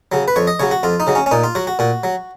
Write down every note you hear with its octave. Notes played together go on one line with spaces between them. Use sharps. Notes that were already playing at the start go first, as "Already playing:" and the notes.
C#3 F#3
B4
F2 C#5
D#5
C#3 F#3 C#5
F#4
F2 F4
D#4
C#3 F#3
C#4
C#4
A#2 D#4
F4
F#3 F#4
F#4
A#2 F#4
F#3